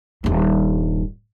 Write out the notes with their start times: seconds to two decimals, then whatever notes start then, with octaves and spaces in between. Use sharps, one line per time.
0.24 D#1 G2